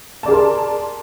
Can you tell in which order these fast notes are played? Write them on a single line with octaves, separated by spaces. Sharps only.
A5 D5 G#4 A#4 C6